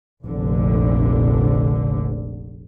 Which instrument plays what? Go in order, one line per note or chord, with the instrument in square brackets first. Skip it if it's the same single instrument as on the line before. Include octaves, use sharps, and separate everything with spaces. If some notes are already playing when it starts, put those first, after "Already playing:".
[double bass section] F1 A#1 D3